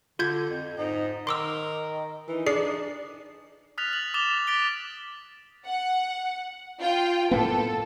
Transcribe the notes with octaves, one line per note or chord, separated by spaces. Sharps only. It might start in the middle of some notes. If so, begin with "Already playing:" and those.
D3 F4 G6 G#6
F2
G#2 D#4
D#3 A#4 C6 D6 E6
E3 D#4
D4 G#4 D5 C7
D#6 F6 F#6 A6 B6 F7
F#7
D6 D#6 A6 E7 F7 G7
A6 B6 D7 G7
F#5
F4 G5
A2 A#3 B3 A4